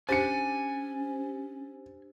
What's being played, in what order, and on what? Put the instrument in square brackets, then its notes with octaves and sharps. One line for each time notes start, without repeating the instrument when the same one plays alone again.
[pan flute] C#4 [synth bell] D4 G4 C5 [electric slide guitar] G#5 [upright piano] A6 C#7